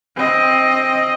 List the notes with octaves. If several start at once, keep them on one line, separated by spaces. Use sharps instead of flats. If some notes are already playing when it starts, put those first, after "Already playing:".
C4 D#5